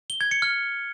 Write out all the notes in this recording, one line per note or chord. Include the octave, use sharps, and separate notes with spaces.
G7
G#6
C#7
F6